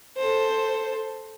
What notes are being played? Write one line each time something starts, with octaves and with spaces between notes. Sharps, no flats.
A4 C5